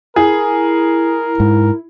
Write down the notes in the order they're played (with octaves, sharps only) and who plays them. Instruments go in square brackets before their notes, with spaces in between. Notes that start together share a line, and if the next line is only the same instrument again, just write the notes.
[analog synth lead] E4 [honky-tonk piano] G#4 [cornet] A#4
[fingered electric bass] G#2